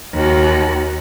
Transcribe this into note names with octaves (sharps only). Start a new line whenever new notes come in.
D#2 F#4